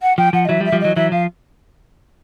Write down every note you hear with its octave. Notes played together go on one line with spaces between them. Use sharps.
F#5
F3 G5
F3 F#5
D#5
E3 F#3 E5
F3 G3
E5
F3 G3
E3 F#3 D#5
E3 F#3 E5
F3 F5